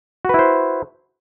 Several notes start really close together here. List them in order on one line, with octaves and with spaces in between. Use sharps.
F#4 B4 E4 C5